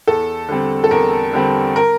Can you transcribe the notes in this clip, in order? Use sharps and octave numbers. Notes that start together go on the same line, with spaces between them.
E2 A4
D3 G3 C4
A4
E2 A#4
D3 G3 C4
A#4